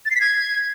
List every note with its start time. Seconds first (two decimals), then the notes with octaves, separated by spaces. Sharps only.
0.06 A6
0.11 C7
0.16 B6
0.21 G#6